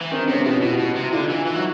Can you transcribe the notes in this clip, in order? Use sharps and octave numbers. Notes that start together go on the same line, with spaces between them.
E3
D#3 C4 D4
C3 B3 C#4
B2 F4 G4
B2 E4 F#4
B2
C3
D3 D#4 F4
E3
E3
F#3